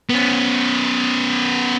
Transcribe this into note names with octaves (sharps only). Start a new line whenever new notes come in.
B3 C#4